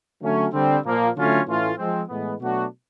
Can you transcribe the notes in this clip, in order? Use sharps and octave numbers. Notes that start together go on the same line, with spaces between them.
D3 F#3 A3 C#4
D3 G3 C4
A#2 F3 A#3
D3 F#3 A3 C#4 F4
A2 E3 A3 C#4 F4
F3 G#3 C4
A2 E3 G#3 B3
B2 F#3 A3 D4 F#4